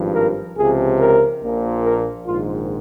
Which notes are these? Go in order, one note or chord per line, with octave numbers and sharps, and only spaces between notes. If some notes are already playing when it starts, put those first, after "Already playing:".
Already playing: G#1 G2 F3
A#4
C#2 C3 F3 G#4
A#4
A#1 A#2 F3
A#4
A#1 G#2 D#3 F4